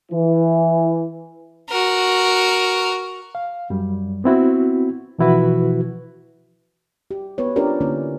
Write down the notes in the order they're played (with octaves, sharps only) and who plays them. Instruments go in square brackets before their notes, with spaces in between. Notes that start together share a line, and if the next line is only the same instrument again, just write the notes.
[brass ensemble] E3
[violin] F#4 A#4
[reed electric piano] F5
F#2 G3
B3 C4 E4 F#4
B2 E3 F3 E4 F#4 B4
[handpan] G4
B3 E4 B4 C#5
C#4 D4 F4 G4 A#4 D5
D3 A#3 C#4 D4 E4